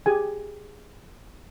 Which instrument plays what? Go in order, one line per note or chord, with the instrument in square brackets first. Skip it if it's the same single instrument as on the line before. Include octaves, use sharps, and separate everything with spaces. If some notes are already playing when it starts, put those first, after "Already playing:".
[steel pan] G4 G#4 G#5